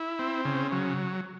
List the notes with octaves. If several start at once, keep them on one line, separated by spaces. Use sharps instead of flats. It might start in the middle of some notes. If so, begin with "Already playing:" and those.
Already playing: E4
C4
C#3
F#3